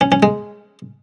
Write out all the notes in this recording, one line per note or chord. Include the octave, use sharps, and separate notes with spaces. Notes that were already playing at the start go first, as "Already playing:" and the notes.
C#4
C#4
G#3